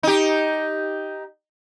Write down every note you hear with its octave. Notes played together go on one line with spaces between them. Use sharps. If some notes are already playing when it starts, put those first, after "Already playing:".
D#4 G4